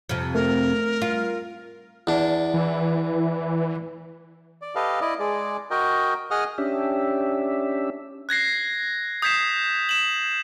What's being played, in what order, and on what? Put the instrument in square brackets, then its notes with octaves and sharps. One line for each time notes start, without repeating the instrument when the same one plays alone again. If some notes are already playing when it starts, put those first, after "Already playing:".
[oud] F2 C3
[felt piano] A3 [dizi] A#4
[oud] F4
[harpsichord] E2 D4
[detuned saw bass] E3
[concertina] D5
G4 A4 B4 D#5 F5
E4 D5 D#5
G#3 G#4 D5
F#4 A#4 D#5 G5
G#4 D#5 F#5 D#6 F6
[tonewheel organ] C#4 D4 G4 E5
[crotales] F#6 G#6 A#6 C7
D#6 G6 G#6 B6 C7 E7
E7 F#7